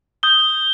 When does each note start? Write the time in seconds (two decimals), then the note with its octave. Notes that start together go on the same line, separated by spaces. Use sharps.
0.23 D#6 G6 G7